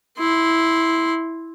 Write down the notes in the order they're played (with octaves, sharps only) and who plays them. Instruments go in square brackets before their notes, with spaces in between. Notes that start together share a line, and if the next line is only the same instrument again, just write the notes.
[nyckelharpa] E4 C6